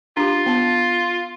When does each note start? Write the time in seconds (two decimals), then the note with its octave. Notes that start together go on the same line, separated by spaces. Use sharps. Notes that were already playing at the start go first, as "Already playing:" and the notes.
0.17 D4 F4 G4
0.46 B3 A5